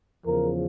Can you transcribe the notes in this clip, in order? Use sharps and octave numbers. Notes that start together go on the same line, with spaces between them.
E2 C#3 F3 A#4